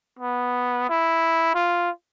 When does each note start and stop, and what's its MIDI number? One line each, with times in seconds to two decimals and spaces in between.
0.19 0.87 59
0.90 1.53 64
1.55 1.90 65